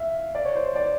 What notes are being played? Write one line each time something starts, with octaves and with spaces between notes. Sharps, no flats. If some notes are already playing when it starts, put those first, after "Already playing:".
Already playing: E5 F5
D5
C#5
C5
C5
D5